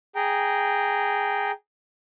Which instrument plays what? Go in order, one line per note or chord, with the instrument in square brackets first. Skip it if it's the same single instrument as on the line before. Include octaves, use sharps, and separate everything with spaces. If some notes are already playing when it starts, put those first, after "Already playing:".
[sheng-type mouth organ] G#4 G5 A#5